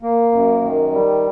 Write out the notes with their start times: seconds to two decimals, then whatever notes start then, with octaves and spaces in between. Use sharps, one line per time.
0.03 A#3
0.32 F#2
0.62 D#3
0.92 G3